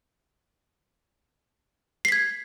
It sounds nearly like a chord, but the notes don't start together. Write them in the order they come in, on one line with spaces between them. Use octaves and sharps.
C7 B6 G#6